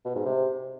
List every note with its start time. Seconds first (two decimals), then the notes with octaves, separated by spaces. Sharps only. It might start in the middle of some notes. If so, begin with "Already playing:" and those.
0.05 B2
0.15 G#2
0.26 C3